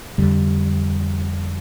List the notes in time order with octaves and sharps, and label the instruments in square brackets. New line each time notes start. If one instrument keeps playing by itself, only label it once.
[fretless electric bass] F2 D3 G3